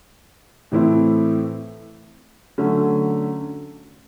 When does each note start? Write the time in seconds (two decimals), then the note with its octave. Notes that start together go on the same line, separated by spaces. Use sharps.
0.71 A2 E3 A3 C4 E4
2.58 D3 F#3 A3 C#4